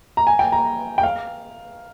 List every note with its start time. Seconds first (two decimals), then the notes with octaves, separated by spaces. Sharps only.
0.17 A#5
0.27 G#5
0.39 G5
0.52 A#5
0.98 G5
1.03 F5